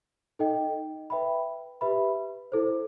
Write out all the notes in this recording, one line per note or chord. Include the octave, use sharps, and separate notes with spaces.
D#4 A4 D#5 G5
B4 E5 G5 B5
G4 B4 E5 B5
E4 A4 C5